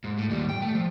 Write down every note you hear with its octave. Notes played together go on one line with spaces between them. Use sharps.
G#2
A2
D#2 G3
G5
A3
F3